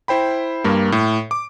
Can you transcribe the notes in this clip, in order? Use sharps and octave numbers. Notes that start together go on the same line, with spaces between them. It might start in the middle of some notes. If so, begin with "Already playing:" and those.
E4 C5 G5 B5
G2 G3 A#3
A2
D6